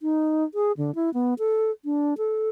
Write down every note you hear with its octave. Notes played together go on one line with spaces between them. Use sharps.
D#4
G#4
D3
E4
B3
A4
D4
A4